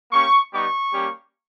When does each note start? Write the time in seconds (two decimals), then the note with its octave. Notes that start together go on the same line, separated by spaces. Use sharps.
0.11 A#3 C#4 G4 C#6
0.52 G3 B3 D#4 G4 C#6
0.93 G3 A#3 C#4 G4